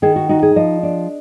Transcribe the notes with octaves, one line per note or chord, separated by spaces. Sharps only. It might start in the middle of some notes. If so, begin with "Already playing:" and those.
D#3 G#4
F#4
D#4 F#4
G#4
F3 D#5
D4